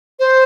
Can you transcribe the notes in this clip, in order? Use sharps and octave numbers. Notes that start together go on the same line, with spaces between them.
C5